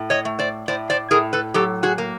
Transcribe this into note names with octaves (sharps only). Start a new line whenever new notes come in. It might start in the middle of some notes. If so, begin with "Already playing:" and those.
Already playing: A2
C#5 D#5
A3
C5 D5
A2 C5 D5
C5 D5
A2 G#4 A#4
A4 B4
F#3 G4 A4
F#4 G#4
A#3